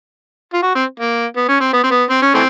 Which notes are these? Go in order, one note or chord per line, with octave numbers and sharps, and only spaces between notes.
F4
F#4
C4
A#3
B3
C#4
C4
B3
C4
B3
C4
C#4
E3 A3 C4